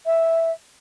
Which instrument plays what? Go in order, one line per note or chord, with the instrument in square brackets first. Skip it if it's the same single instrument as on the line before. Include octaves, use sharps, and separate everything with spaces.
[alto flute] E5